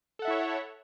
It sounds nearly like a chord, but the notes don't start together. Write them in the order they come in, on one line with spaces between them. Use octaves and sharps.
A4 F#5 E5 E4 C#5